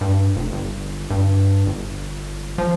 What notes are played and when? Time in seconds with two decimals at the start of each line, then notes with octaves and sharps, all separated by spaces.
0.01 G2
0.36 F1
0.52 G1
1.10 G2
1.66 G1
2.58 F3